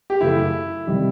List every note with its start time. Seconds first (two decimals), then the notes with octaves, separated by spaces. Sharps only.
0.10 G4
0.21 F#2 C#3 F#3 A3 E4
0.87 C3 D#3 G3